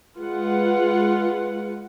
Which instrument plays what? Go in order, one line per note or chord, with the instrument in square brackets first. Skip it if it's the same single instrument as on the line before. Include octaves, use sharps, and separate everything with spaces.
[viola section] G#3 F4 B4 F#5